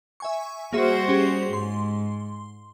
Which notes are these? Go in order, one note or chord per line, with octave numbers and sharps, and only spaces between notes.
E5 G#5 C#6
G3 A#3 F#4 G#4 C5 E5
C#4 G4 G#4
G#2 C6